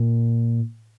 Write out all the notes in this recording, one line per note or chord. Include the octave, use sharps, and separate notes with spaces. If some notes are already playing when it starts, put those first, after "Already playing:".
Already playing: A#2